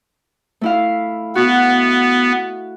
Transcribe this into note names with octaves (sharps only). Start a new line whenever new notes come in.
A3 E4 F5
B3 F#4